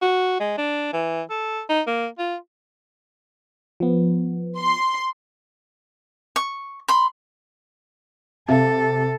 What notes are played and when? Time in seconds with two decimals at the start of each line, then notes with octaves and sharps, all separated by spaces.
0.02 F#4
0.40 G#3
0.58 D4
0.93 E3
1.30 A4
1.69 D#4
1.87 A#3
2.19 F4
3.80 F3 B3
4.57 C6
6.36 C#6
6.88 B5 C6
8.48 C3 C4 A4 E5 F5